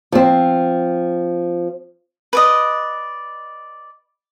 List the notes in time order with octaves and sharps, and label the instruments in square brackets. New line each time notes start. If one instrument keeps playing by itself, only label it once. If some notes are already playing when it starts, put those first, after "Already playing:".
[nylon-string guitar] F3 C4
[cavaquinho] B4 D5 D#5